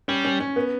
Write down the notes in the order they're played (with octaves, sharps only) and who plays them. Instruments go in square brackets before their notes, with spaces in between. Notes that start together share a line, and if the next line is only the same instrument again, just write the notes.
[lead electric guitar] G3 [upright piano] C#4
[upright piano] C#4
C#4
B3